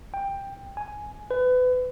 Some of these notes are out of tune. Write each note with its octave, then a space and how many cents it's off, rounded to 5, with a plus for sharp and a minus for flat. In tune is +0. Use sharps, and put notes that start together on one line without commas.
G5 +10
G#5 +5
B4 +30